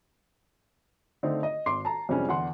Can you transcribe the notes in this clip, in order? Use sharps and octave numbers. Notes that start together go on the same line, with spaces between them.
D3 A3 C4 D#4
D#5
G#1 C6 D6 C7
A5 A#5
F2 C3 G3 G#3 C#4 D4
E2 D3 F#5 C6